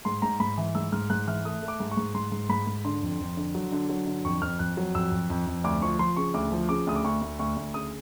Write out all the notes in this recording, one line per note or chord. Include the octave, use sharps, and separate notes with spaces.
G#2 C6
G#2 A#5
G#2 B5
E3
G#2 E6
G#2 F6
G#2 F#6
E3 F6
A3 D#6
A3
D6
G#2
C#6
G#2
G#2 C6
G#2
G#2 B5
G#2
D3 C6
F2
F2
D3
F#3
D3
F#3
D3
F2 C#6
F2 F6
F2 F#6
F#3
F2 E6
F2
F2
F2
D2 D6
F3 C#6
F3 C6
C#3 C#6
D2 D6
F3
C#3 D6
D2 D#6
D6
D2 C#6
D2
D2 C#6
D2
C#3 D#6